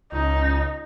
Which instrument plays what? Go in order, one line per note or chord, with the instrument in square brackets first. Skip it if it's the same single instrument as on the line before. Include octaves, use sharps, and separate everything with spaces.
[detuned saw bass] C#2 [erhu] D#4